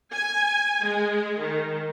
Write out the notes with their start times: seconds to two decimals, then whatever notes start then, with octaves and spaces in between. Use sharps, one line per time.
0.14 G#5
0.85 G#3
1.39 D#3